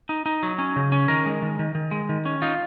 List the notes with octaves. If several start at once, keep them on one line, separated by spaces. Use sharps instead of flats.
D#4
D#4
F#3
C#4
C#3
C#4
D#3 A#4
G#3
D#3
D#3
D#3
G#3
D#3
C#4
D#4 F4